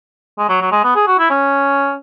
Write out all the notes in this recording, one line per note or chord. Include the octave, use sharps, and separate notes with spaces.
G#3
F#3
F#3
G#3
B3
G#4
F#4
E4
C#4